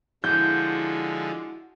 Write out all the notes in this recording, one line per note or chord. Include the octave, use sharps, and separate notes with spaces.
D3 F3 G#3 E4 F#4 G6